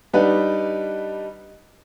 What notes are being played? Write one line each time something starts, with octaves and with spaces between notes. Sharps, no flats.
G3 D4 D#4 B4 F#5